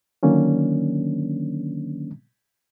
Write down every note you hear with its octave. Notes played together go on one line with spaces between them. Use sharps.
D3 D#3 F#3 A#3 C#4 D4